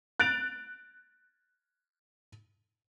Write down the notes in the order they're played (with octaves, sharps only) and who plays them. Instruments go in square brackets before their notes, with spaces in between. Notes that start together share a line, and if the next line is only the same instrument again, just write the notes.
[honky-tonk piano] F#6 A6 D7 F7